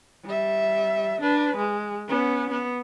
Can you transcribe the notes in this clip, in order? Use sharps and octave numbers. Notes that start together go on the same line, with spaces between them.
G3 E5
D4 B4
G#3
B3 C#4
B3